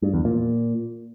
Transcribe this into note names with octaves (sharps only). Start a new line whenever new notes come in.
G2
E2
A#2